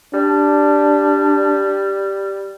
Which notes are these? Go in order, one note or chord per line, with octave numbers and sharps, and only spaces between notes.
G3 D4